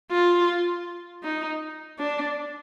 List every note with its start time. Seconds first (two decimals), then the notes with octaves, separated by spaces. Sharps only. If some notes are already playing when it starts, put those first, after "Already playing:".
0.11 F4
1.24 D#4
1.99 D4